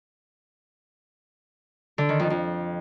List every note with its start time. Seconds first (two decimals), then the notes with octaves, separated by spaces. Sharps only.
1.98 D3
2.09 D#3
2.20 F2
2.30 F2